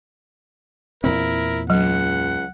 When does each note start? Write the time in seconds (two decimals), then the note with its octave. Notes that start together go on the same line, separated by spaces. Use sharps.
1.04 E2 A#2 C4 E4 A#4
1.70 C#2 F#3 F#5